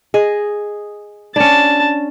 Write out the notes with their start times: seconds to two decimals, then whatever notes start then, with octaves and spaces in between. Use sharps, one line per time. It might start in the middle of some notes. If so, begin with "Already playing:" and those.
0.14 G#4 D#5
1.36 C#4 D4 A5